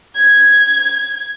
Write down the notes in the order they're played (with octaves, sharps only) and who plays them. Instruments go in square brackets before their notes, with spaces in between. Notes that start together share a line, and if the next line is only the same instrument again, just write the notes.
[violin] G#6